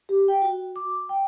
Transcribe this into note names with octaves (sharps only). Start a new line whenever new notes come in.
G4
G5
F#4
D6
G5